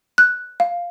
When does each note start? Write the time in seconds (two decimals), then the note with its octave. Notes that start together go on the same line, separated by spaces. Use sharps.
0.18 F#6
0.60 F5